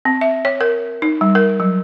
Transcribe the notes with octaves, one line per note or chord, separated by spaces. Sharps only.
C4
E5
C#5
A#4
D#4
G3
A#4
F#3